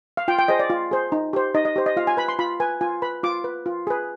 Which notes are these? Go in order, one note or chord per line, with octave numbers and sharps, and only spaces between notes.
F5
F4 G5
G5
G#4 C5 D#5
D5
F4
G#4 C5
D#4
G4 C5
D#4 D#5
D#5
G4 C5
D#5
F4 F5
G#5
B4 B5
C6
F4 B5
B4 G#5
F4 G#5
B4 B5
F4 D6
B4
F4
G#4 B4